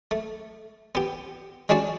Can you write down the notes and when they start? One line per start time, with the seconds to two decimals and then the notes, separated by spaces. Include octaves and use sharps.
0.11 A3
0.95 B3 G4
1.69 G#3 C#4 D4 F#4 D5